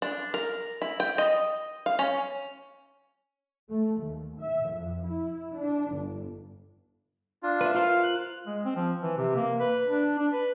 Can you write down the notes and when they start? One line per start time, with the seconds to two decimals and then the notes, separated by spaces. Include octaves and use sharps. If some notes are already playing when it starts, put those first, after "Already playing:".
0.02 D4
0.34 A#4
0.82 E4
1.00 G5
1.18 D#5
1.86 F5
1.99 C#4
3.70 A3
4.01 D#2
4.40 E5
4.71 F2
5.06 E4
5.57 D4
5.95 G1
7.43 D4 F4
7.61 B4 E5
7.75 F4 A#4 C5 F5
8.03 F#6
8.47 G#3
8.65 C4
8.76 F3
9.03 E3
9.17 C3
9.36 A#3
9.60 B4
9.87 D4
10.19 D4
10.33 B4